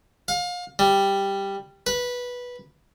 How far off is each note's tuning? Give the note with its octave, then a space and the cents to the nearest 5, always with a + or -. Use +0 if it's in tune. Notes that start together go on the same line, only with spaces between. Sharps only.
F5 +30
G3 +5
B4 -10